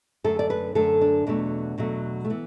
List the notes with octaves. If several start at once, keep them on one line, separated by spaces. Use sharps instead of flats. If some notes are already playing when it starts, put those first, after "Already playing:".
F#2 D3 A3 A4
D5
B4
F#2 D3 A3 A4
D4
E2 B2 F#3 A3
E2 B2 F#3 A3
A3
E3 B3